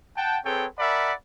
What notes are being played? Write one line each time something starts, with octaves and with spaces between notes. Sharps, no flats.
F#5 G5 A5
C4 G#4 A4 B4 C#5 G5
A#4 D5 E5 F#5 A5 B5